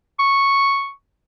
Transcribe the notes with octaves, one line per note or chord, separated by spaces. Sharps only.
C#6